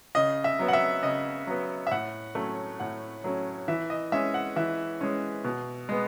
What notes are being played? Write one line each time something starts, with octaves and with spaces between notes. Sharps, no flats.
C#3 D#5
E5
F#3 B3
F#5
E5
C#3 D#5
F#3 B3
E5
A2 F#5
F#3 A3 C#4
A2 F#5
F#3 A3 C#4
E3 E5
D#5
G#3 C#4 E5
F#5
E3 E5
G#3 C#4
B2
G#3 B3